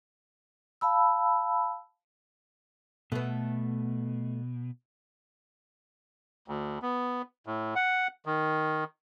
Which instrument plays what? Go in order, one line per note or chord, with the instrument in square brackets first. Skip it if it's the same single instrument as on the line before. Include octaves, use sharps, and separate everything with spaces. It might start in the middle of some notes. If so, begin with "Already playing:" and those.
[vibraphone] F5 A5 B5 E6
[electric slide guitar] B2 [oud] A3 B3
[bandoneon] D2
B3
A2
F#5
D#3